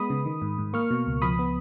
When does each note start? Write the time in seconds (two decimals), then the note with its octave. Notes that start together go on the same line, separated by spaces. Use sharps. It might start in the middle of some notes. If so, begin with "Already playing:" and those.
Already playing: G#3 B3 B5 D#6
0.10 C#3
0.26 D#3
0.42 G#2
0.58 G#2
0.74 A#3 C#6 F6
0.91 B2
1.06 C#2
1.22 F3 B5 D#6
1.39 B3